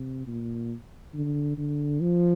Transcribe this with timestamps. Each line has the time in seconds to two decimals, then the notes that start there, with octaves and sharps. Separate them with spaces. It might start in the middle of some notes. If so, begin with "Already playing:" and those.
Already playing: C3
0.27 A#2
1.14 D3
1.58 D3
2.01 F3